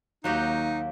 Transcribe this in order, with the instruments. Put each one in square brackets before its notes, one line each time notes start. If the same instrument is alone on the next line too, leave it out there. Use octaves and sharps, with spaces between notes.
[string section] D#2 [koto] F#3 F#4 G4 [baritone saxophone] D#4 [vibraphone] F5